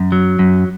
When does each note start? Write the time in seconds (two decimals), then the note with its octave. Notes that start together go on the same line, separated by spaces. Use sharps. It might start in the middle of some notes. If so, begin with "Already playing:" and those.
Already playing: F#2
0.12 F#3
0.39 F#2